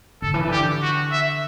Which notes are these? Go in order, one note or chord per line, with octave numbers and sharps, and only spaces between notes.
D3 A4
E3
D3 G4
F#4
E5